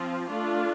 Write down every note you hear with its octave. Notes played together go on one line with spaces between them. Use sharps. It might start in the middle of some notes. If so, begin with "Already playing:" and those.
Already playing: F3 C4 F4
A3 D4 F4